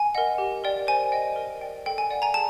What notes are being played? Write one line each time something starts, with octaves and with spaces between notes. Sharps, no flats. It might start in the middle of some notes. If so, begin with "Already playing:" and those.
Already playing: G#5
A#4 D#5 F#5
G4
A#4 D5 G5
C5 G#5
D#5 G5
A#4
D5 G5
A4 G5
G#5
D5 F#5
G#5 A#5
G#4 A5